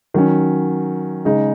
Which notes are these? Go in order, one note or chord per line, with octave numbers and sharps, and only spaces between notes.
D#3 F#3 C#4
C#3 G#3 D#4